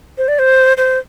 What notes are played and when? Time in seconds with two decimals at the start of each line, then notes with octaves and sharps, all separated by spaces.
0.18 C5
0.28 D5
0.39 C5
0.77 C5